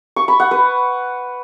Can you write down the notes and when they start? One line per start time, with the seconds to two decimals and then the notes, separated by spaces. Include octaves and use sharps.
0.16 C#6
0.28 B5
0.40 F#5
0.51 B4